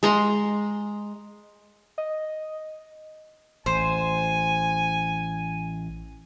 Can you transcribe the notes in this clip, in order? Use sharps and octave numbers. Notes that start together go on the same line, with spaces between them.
G#3 A#5 C6
D#5
A1 C5 G#5